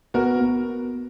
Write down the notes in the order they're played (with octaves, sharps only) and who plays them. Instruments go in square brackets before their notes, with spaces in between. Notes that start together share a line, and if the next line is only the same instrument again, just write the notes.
[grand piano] B3 [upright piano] F#4 A#4
[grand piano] B3